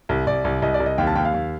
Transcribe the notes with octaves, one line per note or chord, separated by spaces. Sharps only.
C2
C2 D5
C2
C2 D#5
D5
C2
D#5
D#2 G5
A5
D#2 G5
F5
D#2